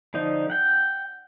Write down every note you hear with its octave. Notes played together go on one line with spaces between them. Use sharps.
D3 F3 D#4
F#5 G5